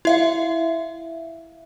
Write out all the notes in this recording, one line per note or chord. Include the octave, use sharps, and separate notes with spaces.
E4 E5 F5